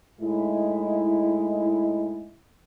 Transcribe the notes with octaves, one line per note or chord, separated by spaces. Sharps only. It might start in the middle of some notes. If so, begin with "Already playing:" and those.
A2 G#3 D#4 E4